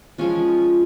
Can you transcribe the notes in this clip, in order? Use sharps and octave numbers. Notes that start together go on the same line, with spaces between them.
F3 G#3 C#4 F4